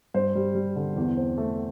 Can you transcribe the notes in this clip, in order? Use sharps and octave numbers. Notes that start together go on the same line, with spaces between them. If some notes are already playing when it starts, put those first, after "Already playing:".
G2 C5
G3
G3
D3
E2
C4
A3